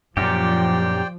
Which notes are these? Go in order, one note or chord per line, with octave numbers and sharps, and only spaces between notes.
F#2 A#2 F3 G4 C5 D5 G5